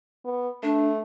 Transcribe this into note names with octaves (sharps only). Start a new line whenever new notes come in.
B3
A3 D4